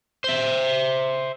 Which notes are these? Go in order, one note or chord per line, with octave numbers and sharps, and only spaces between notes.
C5 E5